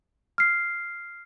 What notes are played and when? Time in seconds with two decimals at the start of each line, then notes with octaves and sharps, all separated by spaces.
0.38 F6 C7